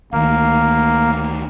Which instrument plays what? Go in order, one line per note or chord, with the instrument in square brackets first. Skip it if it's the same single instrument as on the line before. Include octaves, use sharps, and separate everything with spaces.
[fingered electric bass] D2 D#3 [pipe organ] A#3